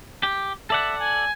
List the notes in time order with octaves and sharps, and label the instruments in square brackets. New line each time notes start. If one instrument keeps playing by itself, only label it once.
[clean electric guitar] G4
[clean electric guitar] A4 D5 F#5 [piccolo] E5
[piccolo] G#5